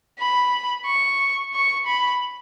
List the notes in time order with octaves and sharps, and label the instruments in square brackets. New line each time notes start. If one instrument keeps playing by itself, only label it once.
[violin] B5
C#6
C#6
B5